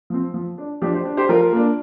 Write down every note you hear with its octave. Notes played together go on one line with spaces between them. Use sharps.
F3 C4
F3
D4
F3 D4 G4
G4 C5
D4
G4 C5
F3 F4 A#4
A#3 D4